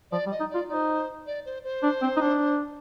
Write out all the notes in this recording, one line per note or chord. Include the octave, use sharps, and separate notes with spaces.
F3 D5
G3
D#5
D#4
F4 D5
D#4 D5
C5
D5
C5
C5
D4
C4
D#4
D4